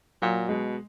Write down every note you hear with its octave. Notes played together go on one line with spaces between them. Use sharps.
A#2 F#3
B2 G#3